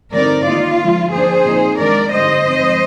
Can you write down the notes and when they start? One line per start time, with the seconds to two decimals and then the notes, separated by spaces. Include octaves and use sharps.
0.12 D3 G3 C4 D#4 A#4 D5
0.46 D#3 A#3 D#4 F4
0.80 D3 F3 G#3
1.12 F3 A#3 D4 G#4 C5
1.45 A#2 F3 C4 D#4
1.78 D#3 G#3 D4 A#4 D5
2.12 D3 G3 C4 D#4 C5 D#5
2.45 F3 G#3 C4